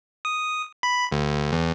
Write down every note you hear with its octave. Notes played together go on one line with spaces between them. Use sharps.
D#6
B5
D2
E2